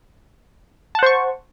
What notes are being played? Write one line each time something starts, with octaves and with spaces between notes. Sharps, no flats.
C5 F#5 A5 C#6